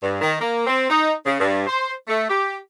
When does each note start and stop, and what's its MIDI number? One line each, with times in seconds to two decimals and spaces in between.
0.03 0.20 43
0.21 0.36 51
0.41 0.65 58
0.67 0.88 60
0.89 1.12 63
1.26 1.38 49
1.40 1.66 43
1.67 1.92 72
2.08 2.27 57
2.30 2.56 67